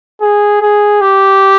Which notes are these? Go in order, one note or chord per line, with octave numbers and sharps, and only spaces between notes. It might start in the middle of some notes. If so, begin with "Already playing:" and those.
G#4
G#4
G4